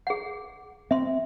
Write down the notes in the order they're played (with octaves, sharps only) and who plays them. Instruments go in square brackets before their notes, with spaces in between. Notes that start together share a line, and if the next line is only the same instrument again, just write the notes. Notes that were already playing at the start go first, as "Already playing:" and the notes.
[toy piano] G#4 F#5
[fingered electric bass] C4 [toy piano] E5 C6